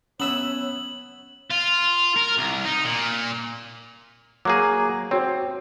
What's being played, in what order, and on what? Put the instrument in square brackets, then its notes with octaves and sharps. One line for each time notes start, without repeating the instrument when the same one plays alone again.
[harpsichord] B3 B4 E5 [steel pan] C#4 E6 [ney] C#5 [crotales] F#7
[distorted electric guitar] F4
A#4
C2
D#4
A#2
[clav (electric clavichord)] F#3 A#3 G#4 [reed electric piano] D6
[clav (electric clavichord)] C4 [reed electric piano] F#4 C#5